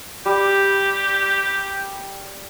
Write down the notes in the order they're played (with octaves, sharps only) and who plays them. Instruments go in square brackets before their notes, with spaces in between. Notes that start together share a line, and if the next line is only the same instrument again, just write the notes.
[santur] G3 [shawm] G4